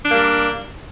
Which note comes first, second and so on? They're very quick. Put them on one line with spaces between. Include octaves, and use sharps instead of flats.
D4 A#3 G3